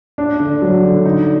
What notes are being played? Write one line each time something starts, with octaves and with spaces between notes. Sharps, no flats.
D4
D3
F#3
D3
D#4